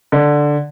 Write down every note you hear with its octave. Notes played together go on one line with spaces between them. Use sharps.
D3